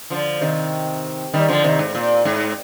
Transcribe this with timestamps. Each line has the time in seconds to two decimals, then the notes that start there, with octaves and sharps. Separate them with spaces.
0.10 D3 F3
0.41 C3 D#3
1.34 D#3 G3
1.49 D3 F3
1.64 C3 D#3
1.79 G#2
1.95 A#2
2.25 G#2